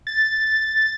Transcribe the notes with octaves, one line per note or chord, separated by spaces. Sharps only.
A6